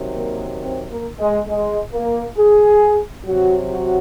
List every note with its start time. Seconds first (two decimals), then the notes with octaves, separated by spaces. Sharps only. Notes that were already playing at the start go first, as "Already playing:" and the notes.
Already playing: C3 D#3 F#3
0.15 A#3
0.60 C4
0.89 A#3
1.19 G#3
1.48 G#3
1.93 A#3
2.37 G#4
3.25 C3 F#3 F#4
3.70 F#4